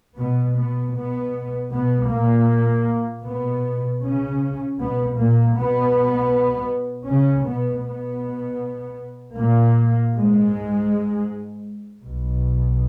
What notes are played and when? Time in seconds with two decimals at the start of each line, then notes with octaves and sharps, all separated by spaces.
0.18 B2 B3
0.58 B2 B3
0.96 B2 B3
1.72 B2 B3
2.10 A#2 A#3
3.25 B2 B3
4.02 C#3 C#4
4.78 B2 B3
5.17 A#2 A#3
5.55 B2 B3
7.07 C#3 C#4
7.46 B2 B3
7.85 B2 B3
9.38 A#2 A#3
10.15 G#2 G#3
12.05 B1 B2